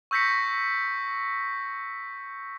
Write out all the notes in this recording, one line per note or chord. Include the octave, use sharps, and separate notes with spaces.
C#6 E6 G6 A#6 B6 C#7